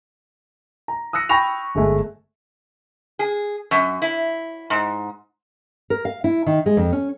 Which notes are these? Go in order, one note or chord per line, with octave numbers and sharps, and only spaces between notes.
A#5
D#6 E6 F#6 A#6 C#7
G5 B5 C#6 A#6 F7
G1 G#3 A3 G#5
G#4
F#2
E4
G#2
A#4
F5
E4
D#3
G#3
F2
C#4